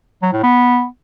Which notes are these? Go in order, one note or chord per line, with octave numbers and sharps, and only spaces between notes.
F#3
A2
B3